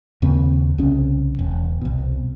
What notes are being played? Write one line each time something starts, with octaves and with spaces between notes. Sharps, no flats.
D#2 C#3 C4
C2 C#3 C#4
E1
C2 B2